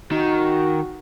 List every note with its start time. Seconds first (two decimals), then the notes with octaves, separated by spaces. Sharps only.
0.11 D#3 F#4